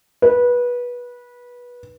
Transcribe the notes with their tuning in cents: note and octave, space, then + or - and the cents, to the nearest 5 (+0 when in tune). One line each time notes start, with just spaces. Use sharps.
B4 -20